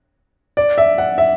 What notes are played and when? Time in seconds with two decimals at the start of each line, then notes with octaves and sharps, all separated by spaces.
0.57 D5
0.78 E5
0.98 F#5
1.18 E5